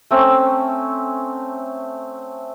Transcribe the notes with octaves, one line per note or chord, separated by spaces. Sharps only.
A3 C4 C#4